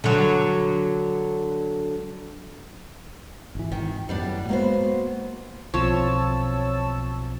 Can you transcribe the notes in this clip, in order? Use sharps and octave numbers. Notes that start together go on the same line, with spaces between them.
D3 F#3
G#1 E3
G#1 D#3
F#2 A2 G3 B3 D4
F#3 G#3 A#3 B3 C5
B1 F3 C4 C#5 A5 C#6 E6